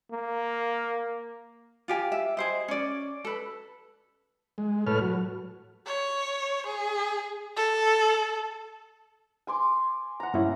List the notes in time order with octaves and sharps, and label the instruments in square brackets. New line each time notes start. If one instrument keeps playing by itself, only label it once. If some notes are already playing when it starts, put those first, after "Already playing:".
[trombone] A#3
[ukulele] F4 G4 G#5
E5
G#4 C5 D#5
C#4 D5
A4 B4
[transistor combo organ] G#3
A2 A4 B4 C#5 F6
F#3
[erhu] C#5
G#4
A4
[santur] G#5 C6 D6
F#5 A#5
[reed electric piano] G2 A#3 E4 [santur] C#4